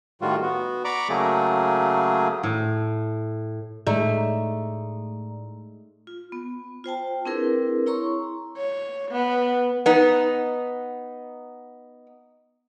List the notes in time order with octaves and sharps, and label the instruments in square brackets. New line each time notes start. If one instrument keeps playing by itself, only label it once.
[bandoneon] A2 D#3 G3 F4 F#4
B3 F#4
D5 A#5 B5 C#6 D6
C#3 F#3 A3 A#3 G#4
[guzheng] A2
[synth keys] A2 [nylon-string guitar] G#3 D#4 C#5 [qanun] A3 [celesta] D5 A#5
[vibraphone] F4
B3
F4 C5 G5 A5
C4 D4 E4 G#4 A#4 B4
E4 C#5 A#5 C6 C#6
[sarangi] C#5
B3
[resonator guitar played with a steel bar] B3 D#4